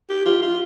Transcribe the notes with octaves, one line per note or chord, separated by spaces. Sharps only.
G4
F4
F4